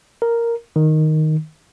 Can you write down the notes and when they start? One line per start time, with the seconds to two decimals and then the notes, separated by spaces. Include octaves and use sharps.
0.22 A#4
0.76 D#3